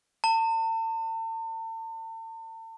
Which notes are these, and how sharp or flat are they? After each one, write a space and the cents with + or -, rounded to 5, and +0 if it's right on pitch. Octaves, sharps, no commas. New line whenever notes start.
A5 +40